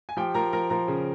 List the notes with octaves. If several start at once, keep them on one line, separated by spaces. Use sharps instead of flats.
G#5
F3 G4 G5
F3 A#4 A#5
F3 A#4 A#5
F3 A#4 A#5
C#3